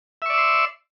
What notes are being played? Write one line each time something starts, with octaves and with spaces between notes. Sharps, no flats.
D5 E5 C6 C#6 E6